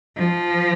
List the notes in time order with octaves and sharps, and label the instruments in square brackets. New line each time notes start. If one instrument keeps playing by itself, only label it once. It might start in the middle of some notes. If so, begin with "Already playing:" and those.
[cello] F3